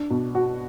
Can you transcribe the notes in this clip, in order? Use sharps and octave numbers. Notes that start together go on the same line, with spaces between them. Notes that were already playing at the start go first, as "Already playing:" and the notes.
Already playing: D4
B2
F#4